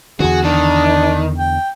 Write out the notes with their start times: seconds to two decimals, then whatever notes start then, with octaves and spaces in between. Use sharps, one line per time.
0.20 E2 D3 F#4 G#4
0.44 D#3 D4
1.38 G5